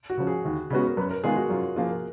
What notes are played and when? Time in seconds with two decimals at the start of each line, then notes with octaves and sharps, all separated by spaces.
0.10 F#4
0.18 C#3 F3
0.27 G#4
0.45 D#2
0.70 C#3 G#3 B3 F#4
0.86 A#4
0.97 F#2 B4
1.10 A#4
1.24 D#3 G#3 B3 F4 G#4
1.37 F#4
1.50 F#2 F4
1.76 F3 A#3 F4 G#4
1.90 A#4